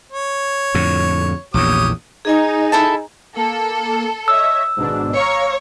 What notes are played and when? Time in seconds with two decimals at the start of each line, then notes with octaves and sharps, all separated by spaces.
0.12 C#5
0.74 F2 A2 D3
1.54 A#1 E2 A#2 G4 C#5 D#6
2.25 D#4 G#4 D#5 G#5
2.72 E4 A4 A5
3.37 A#3 A4
4.28 C#5 D#5 E5 E6
4.77 G#1 G#2 B2 D4
5.16 C#5 F5 A#5